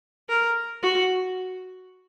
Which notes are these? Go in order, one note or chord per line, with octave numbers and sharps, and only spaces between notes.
A#4
F#4